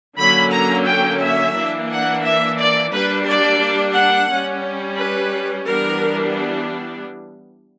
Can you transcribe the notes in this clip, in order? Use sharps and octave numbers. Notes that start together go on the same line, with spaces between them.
D3 F#3 A#3 C#4 B5
A#5
G5
E5
E3 A#3 D4
F#5
E5
D5
G3 A#3 D4 B4
D5
F#5
G3 C#4
B4
E3 G3 B3 D4 A#4